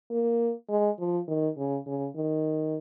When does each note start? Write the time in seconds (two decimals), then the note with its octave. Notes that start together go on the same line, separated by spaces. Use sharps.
0.11 A#3
0.69 G#3
0.99 F3
1.28 D#3
1.58 C#3
1.87 C#3
2.16 D#3